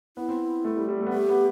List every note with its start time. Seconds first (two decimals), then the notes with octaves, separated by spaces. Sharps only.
0.17 B3 E4
0.28 C4
0.64 A3
0.77 G3
0.88 G3
1.01 A3
1.06 B3
1.12 A3 G4
1.29 B3